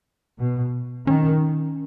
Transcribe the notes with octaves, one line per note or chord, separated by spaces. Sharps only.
B2
D#3 C#4